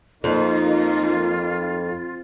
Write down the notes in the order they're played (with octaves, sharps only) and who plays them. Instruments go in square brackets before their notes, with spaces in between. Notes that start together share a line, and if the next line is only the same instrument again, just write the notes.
[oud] F2 [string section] F3 A#3 D#4 [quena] F4